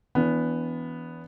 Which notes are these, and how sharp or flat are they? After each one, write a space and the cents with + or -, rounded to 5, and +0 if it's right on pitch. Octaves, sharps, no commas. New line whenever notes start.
E3 +0 B3 +0 D4 -40